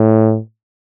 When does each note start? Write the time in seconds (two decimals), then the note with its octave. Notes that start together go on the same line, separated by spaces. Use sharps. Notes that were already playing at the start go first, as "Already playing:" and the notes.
Already playing: A2